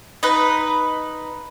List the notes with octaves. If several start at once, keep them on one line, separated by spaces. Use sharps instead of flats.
D#4 B4